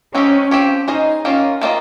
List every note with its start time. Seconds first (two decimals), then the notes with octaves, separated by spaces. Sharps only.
0.15 G#3 C4 C#4 D#4 G4
0.51 F3 C4 G4 C#5
0.87 C#4 D#4 G#4 C5 D#5
1.25 D#3 A#3 C#4 F4
1.62 D#3 A#3 F4 C5 D#5